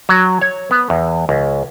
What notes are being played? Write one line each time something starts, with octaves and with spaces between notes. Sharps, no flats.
F#3
C#5
B3
E2
C#2